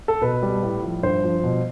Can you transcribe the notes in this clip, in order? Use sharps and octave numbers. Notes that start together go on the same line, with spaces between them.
A4
B2 B4
G3
A2
F3
G2 C5
F3
B2